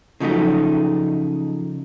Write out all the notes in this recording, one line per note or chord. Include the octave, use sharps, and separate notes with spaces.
C#3 F3 F#3 A3 D#4